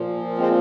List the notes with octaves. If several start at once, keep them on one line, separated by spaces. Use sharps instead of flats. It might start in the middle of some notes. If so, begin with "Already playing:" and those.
Already playing: A#2 F3
G#3 C4